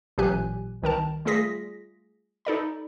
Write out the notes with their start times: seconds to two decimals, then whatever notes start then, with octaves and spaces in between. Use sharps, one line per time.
0.18 A1 A#2 F#3 G4 G#5 F#6
0.82 C2 D#3 A#4 A5
1.25 G3 A3 F4 G#4 A#6 B6
2.45 D#4 A4 D5 B5